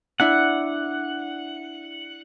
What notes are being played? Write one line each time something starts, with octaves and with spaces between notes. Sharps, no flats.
D4 E4 F#5